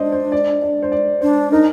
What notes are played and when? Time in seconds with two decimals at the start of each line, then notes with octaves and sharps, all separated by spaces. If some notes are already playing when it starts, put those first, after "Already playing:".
Already playing: D4 C5 D5 D#5
0.12 C5
0.32 D5
0.62 D5
0.82 C5
0.92 D5
1.21 D4 C5
1.51 D#4 A#4